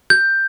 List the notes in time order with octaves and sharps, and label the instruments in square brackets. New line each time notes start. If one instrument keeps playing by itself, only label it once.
[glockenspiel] G6